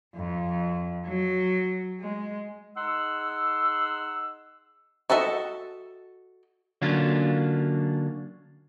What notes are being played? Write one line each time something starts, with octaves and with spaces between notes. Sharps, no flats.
F2
F#3
G#3
D#4 G#4 F#5 C6 E6
F#4 A4 D#5 E5
D3 F#3 A#3 C#4 D4 F4